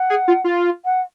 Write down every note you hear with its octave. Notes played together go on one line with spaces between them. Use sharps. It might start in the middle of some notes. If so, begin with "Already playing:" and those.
Already playing: F#5
G#4
F4
F4
F#5